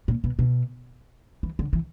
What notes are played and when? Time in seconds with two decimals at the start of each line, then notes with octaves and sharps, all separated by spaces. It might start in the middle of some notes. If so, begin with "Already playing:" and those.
0.08 A#2
0.24 B2
0.39 B2
1.43 E3
1.59 D3
1.73 E3